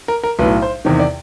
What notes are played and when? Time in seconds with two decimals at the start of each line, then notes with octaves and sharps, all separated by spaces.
0.08 A#4
0.23 A#4
0.39 B1 A2 F#3 B4
0.62 C5
0.85 E2 C3 D#3
1.00 D5